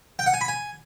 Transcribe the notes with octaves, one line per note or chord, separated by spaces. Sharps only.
G5
F#5
G#5
B5
G#5